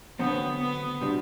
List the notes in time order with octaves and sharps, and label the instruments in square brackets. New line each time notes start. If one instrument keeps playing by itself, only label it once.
[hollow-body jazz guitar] D3 F#3 C4 [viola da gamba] B3
[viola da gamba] B3
[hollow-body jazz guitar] C3 G3 D4 F#4